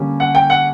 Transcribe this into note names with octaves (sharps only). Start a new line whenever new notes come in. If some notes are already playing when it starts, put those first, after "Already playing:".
Already playing: D3 G3 A#3 C#4
F#5
G5
F#5